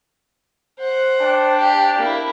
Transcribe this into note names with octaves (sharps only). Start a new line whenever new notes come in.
C5 F#5
D4 G5
G4
A#3 E4